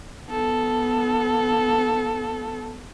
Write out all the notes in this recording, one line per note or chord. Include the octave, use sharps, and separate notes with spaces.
B3 A4